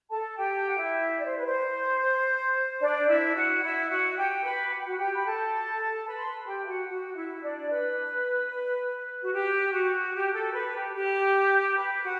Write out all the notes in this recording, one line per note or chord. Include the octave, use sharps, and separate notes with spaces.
A4 A5
G4 G5
F#5
E4 E5
D5
C5
B4
C5
D4 D5
E4 E5
F#4 F#5
E4 E5
F#4 F#5
G4 G5
B4 B5
F#5
G5
F#4 F#5
G4 G5
B5
A4 A5
B4 B5
C6
B4 B5
G4 G5
E5
F#4 F#5
F#4 F#5
E4 E5
E5
D4 D5
B4
F#4
G4
F#4
G4
A4
B4
G4
G4
B4
F#4 F#5